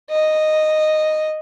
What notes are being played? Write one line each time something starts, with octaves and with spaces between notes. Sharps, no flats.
D#5